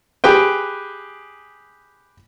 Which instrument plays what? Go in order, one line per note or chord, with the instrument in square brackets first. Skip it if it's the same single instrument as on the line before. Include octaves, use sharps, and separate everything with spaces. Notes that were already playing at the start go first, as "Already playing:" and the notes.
[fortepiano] G4 G#4 B4 G5